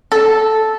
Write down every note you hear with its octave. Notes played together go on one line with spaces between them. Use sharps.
A4